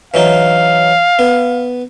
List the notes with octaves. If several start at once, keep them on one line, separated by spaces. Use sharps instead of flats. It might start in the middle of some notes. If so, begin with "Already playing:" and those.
E3 F#3 D#4 F5
B3